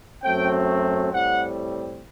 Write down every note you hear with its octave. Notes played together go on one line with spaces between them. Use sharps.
F#2 F#3 A3 C4 G5
A2 G3 C4 F#5